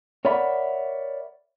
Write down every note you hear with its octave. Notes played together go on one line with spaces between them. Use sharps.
A#4 C#5 D5 E5 F#5 B5